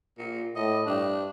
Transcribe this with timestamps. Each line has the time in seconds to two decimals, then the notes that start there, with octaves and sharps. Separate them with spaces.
0.18 A#2
0.56 A2 D#5
0.86 G2 D4